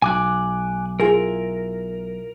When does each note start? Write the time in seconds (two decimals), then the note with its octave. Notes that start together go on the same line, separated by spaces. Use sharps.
0.02 B1 G#5 D6 F#6
1.00 E4 F4 G#4 A#4